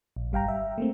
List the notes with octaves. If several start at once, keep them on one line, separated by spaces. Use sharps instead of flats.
A#1
G1 G3 F5 G5 A#5
E5
A3 A#3 C4